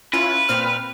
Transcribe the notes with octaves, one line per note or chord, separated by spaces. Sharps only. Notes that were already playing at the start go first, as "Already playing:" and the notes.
C#4 E4 F4 B4
A#2 C4 F6